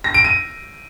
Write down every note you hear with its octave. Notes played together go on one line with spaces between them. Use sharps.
A#6
D7
D#7